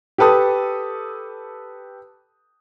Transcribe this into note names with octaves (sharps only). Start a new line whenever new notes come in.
G4 A4 B4 A5 D#6